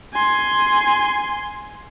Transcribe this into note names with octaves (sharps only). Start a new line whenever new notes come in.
G#5 C6